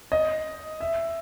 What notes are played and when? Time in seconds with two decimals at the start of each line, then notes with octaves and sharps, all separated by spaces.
0.12 D#5
0.81 E5